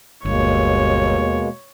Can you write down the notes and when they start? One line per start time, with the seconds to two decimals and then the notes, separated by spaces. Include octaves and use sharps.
0.25 G1 D#2 B2 G#3 A#3 C#5